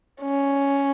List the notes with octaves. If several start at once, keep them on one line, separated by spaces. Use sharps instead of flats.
C#4